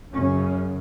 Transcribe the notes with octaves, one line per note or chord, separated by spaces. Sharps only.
F#2 C#3 C#4